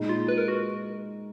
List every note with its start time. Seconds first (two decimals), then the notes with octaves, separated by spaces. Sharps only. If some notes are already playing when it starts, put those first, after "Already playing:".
Already playing: A#2 G#3 D#4
0.09 F4
0.28 B4
0.38 A#4
0.48 F#4